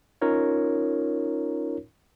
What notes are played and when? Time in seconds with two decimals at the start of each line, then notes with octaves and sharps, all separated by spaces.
0.22 C#4 D#4 F4 A#4 C#5